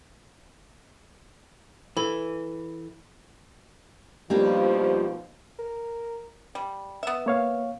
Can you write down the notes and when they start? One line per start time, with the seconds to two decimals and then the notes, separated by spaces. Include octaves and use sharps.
1.97 E3 A4 B5
4.30 D#2 B2 F3 G3 A#3 D4
5.59 A#4
6.55 G3
7.03 B3 E5
7.26 A#3 C#5 F5